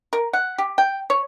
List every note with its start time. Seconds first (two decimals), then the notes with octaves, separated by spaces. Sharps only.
0.13 A#4
0.33 F#5
0.58 G4
0.78 G5
1.10 C#5